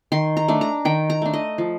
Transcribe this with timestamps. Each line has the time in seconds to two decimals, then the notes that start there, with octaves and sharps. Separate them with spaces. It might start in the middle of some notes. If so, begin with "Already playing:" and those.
0.12 D#3 C6
0.37 A#5
0.48 A3 D4
0.61 A#5
0.85 D#3 G5
1.10 A#5
1.22 A3 D4
1.33 D#5
1.58 F3